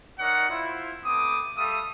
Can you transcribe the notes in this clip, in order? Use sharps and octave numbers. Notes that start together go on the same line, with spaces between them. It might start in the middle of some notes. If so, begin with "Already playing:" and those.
D#4 A#4 C#5 D5 F#5
E4 F4 C5
A3 B3 C4 D6 D#6
G3 A4 E5 F5 C#6 D#6